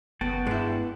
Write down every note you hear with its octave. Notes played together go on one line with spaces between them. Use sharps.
F#1 B3 F#4 G5 A5
G2 G#3 E4